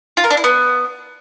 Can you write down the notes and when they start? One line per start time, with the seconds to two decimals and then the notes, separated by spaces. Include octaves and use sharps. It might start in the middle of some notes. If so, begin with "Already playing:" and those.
0.17 F4
0.24 A#4
0.31 D4
0.37 E4
0.44 B3